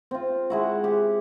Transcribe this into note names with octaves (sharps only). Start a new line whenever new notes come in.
C4 F4
G#3 E4 F#4
G4